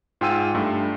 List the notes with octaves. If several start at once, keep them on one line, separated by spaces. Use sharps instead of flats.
G#2 F4 G5 G#5 E6 D#7
G2 A3